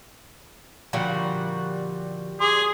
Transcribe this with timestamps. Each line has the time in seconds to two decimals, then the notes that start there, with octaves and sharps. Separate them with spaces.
0.93 A#2 D3 F3 G3 F#4
2.40 G#4 C6 D6